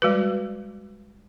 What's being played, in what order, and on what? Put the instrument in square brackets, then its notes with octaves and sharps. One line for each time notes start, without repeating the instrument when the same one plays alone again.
[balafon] G3 G#3 F#4 B4